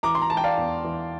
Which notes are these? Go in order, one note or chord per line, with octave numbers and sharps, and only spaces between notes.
E3 A#5 D6
C6
A#5
E3 A5
G5
D5 F5
E2
E3